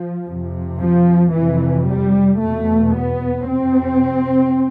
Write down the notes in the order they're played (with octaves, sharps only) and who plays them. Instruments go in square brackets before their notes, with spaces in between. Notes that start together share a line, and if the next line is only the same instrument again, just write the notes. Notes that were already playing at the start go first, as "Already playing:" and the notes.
Already playing: [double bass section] F3
F2 C3
F3
F2 C3 E3
G3
E2 B2 A3
B3
F2 C3 C4